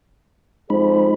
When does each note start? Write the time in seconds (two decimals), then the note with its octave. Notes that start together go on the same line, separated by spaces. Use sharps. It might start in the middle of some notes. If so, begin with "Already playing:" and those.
0.70 F2 G#3 D#4 G#4 C5 B5